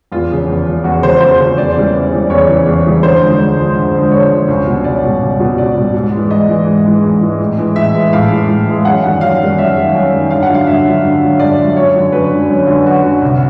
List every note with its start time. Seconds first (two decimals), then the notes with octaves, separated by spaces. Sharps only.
0.12 E2 F4
0.30 C#3 F3
0.47 E2
0.67 C#3 F3
0.84 E2 F#4
1.02 C#3 F3 C5
1.21 E2 C5
1.39 C#3 F3
1.57 E2 D5
1.76 C#3 E3 G3
1.94 E2
2.12 C#3 E3 G3
2.29 E2 C#5
2.48 C#3 E3 G3
2.66 E2
2.85 C#3 E3 G3
3.02 D2 C5
3.20 D3 F3 G#3
3.39 D2
3.58 D3 F3 G#3
3.75 D2
3.94 D3 F3 G#3
4.11 D2 C#5
4.31 D3 F3 G#3
4.48 C#2
4.66 B2 G3
4.84 C#2 D5
5.03 B2 G3
5.22 C#2
5.39 B2 G3
5.57 C#2 D5
5.76 B2 G3
5.94 G#2
6.12 E3 G#3
6.31 G#2 D#5
6.49 E3 G#3
6.67 G#2
6.85 E3 G#3
7.04 G#2
7.21 E3 G#3
7.40 A2
7.58 E3 G#3
7.76 A2 E5
7.94 E3 G#3
8.13 A2 F5
8.31 E3 G#3
8.48 A2
8.67 E3 G#3
8.85 F#2 F#5
9.03 D#3 G3 F#5
9.21 F#2 F5
9.41 D#3 G3
9.58 F#2 E5
9.76 D#3 G3
9.95 F#2
10.12 D#3 G3
10.30 G2 F5
10.43 F#5
10.49 D3 F#3
10.55 F5
10.67 G2 E5
10.86 D3 F#3
11.03 G2
11.23 D3 F#3
11.40 G2 D5
11.59 D3 F#3
11.76 F#2 C#5
11.94 D3 F#3
12.12 F#2 B4
12.31 D3 F#3
12.50 F#2
12.67 D3 F#3
12.85 F#2 F#4
13.03 D3 F#3
13.22 C2